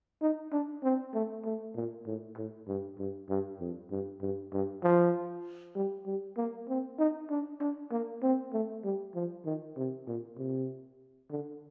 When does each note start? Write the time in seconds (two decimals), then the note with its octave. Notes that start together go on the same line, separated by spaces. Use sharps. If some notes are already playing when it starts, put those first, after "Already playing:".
0.22 D#4
0.52 D4
0.83 C4
1.14 A3
1.45 A3
1.76 A#2
2.06 A2
2.37 A2
2.68 G2
2.99 G2
3.29 G2
3.60 F2
3.91 G2
4.22 G2
4.53 G2
4.84 F3
5.76 G3
6.06 G3
6.37 A#3
6.69 C4
6.99 D#4
7.30 D4
7.61 D4
7.92 A#3
8.23 C4
8.53 A3
8.84 G3
9.15 F3
9.46 D#3
9.77 C3
10.07 A#2
10.38 C3
11.31 D3